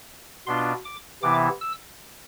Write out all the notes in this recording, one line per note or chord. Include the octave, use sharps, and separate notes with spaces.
B2 B3 D4 F4 C6
D6
C3 E3 B3 E4 D6
E6